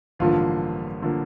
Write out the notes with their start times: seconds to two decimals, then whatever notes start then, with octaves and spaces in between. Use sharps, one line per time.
0.19 A1 G2 D3 F3 A#3 F4
1.02 D3 F3 A#3